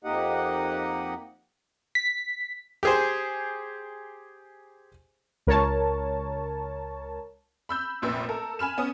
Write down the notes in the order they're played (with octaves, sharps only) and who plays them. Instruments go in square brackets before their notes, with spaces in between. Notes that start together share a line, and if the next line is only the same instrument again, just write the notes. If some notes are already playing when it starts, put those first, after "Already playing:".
[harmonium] F2 A#3 D#4 G4 D#5 F#5
[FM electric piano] B6
[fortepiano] G4 G#4 C5
[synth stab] C#2 A#4 C#5 A5
[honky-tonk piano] B5 E6 G6
F1 A#1 A#2 B4 E6
A4 A#4
G#5 B5 F6 E7
B3 C#4 G#5 D#6